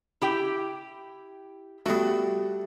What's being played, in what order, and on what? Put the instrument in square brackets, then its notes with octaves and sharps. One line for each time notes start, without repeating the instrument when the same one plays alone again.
[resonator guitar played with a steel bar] E4 G4 G5
[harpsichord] G3 A3 [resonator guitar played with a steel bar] B3 F#4